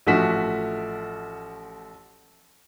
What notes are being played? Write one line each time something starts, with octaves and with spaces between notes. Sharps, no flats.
A1 F3 A3 F#4 B6